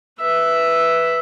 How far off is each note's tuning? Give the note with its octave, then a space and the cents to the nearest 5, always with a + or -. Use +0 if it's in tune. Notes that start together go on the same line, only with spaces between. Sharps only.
B4 +0 E5 +0